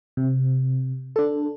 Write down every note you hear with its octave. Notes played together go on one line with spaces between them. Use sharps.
C3
D4 A4